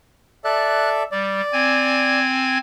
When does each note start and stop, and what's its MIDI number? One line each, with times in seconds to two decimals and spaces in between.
0.44 1.03 69
0.44 1.03 74
0.44 1.03 76
0.44 0.89 90
1.12 1.41 55
1.12 2.19 74
1.53 2.58 60
1.53 2.58 80
1.53 2.58 92